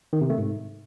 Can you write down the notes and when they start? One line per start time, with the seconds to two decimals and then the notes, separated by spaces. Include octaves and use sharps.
0.13 D#3
0.21 C3
0.30 A3
0.38 G#2